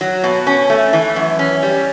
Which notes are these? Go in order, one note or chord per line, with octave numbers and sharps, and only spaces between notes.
F#3
B2
C#4
A3
E3
F#2
C#4
G3